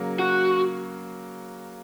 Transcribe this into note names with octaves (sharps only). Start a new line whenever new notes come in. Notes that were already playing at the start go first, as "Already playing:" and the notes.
Already playing: C#3 F#3 A#3
F#4